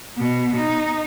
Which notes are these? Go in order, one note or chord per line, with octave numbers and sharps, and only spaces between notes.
B2
D#4